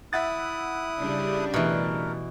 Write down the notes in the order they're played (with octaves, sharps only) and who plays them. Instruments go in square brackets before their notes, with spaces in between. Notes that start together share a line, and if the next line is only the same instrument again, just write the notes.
[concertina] E4 D#6 F#6 [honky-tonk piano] E5 F#5 A6
[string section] C#3 G3 D4
[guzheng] B2 E3 [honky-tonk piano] A3 B3 [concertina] A#4